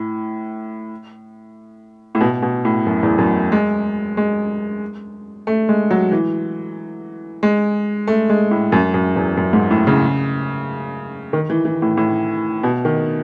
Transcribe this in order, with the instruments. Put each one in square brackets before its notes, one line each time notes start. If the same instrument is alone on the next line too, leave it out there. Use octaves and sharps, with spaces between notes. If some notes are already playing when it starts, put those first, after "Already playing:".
Already playing: [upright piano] A2
A2
B2
B2
A2
F#2
E2
F#2
G#3
G#3
A3
G#3
F#3
E3
G#3
A3
G#3
A2
F#2
F#2
E2
F#2
G#2
A2
C#3
D#3
E3
E3
A2
A2
B2
D#3